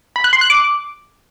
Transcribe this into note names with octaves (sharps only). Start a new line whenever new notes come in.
B5
F#6
C6
F#6
D6